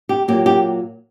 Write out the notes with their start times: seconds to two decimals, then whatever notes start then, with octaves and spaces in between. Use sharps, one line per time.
0.09 G4
0.28 A#2 F#3 A#3 G4
0.46 G4